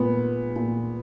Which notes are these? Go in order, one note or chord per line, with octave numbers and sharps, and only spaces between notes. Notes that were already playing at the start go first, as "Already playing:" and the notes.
Already playing: A#2 B3
A#2